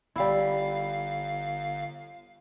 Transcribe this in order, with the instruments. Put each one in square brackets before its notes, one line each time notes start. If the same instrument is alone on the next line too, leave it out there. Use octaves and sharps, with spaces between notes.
[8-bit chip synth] G1 F5 [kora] G3 E4